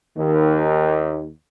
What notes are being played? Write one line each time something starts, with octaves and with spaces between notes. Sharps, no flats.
D#2 D#3